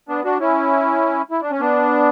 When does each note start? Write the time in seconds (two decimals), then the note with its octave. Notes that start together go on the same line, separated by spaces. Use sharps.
0.09 B3 D4
0.24 D4 F#4
0.40 C#4 E4
1.31 E4
1.41 D4
1.51 C#4
1.60 B3 D4